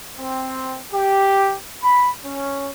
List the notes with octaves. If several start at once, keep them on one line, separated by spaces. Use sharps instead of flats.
C4
G4
B5
C#4